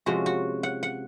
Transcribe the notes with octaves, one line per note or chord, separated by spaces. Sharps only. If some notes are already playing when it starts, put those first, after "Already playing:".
C3 F3 G#3 C#4 F#4
F#4
F#5
F#5